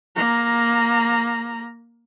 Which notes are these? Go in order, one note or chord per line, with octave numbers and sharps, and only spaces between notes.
A#3 A#5